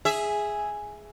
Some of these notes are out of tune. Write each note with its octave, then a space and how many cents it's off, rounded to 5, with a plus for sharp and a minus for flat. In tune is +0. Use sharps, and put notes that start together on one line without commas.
G#4 +0 E5 +0